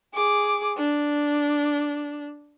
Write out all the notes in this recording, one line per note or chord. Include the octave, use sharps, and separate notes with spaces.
G#4 D6
D4